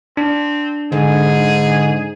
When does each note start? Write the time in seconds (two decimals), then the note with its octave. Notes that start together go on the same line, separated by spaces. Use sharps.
0.17 C4 D4
0.92 G#2 D3 G#4